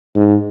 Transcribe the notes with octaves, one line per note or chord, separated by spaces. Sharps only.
G#2